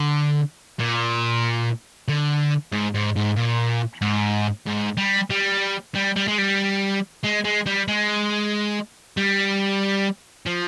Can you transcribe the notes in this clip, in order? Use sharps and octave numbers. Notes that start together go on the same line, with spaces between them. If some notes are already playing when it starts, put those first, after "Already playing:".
Already playing: D3
A#2
D3
G#2
G#2
G#2
A#2
G#2
G#2
G3
G3
G3
G3
G#3
G3
G#3
G#3
G3
G#3
G3
F3